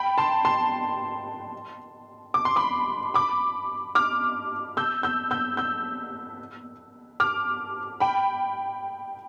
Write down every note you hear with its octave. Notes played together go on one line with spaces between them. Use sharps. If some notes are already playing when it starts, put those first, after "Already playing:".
Already playing: G5 B5
A5 C6
A5 C6
D6
C6
B5 D6
B5 D6
D6 F6
E6 G6
E6 G6
E6 G6
E6 G6
D6 F6
G5 B5